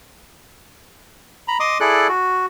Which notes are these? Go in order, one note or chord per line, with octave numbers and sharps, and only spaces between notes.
A#5 B5
D#5 C6 D6 D#6
E4 G#4 A4 D5 F#6
F#4